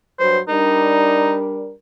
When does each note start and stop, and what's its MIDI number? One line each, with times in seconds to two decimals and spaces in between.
0.20 0.40 43
0.20 0.40 54
0.20 0.40 71
0.20 0.39 72
0.49 1.72 55
0.49 1.72 62
0.49 1.35 63
0.49 1.72 70